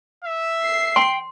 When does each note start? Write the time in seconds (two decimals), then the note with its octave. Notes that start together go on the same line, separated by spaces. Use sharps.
0.24 E5
0.63 C7
0.96 G5 C6